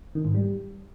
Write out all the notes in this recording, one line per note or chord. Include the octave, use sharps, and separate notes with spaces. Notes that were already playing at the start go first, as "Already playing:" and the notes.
D#3
G#2
G3